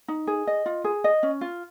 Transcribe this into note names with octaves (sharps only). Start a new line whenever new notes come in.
D#4
G#4
D#5
F4
G#4
D#5
C#4
F4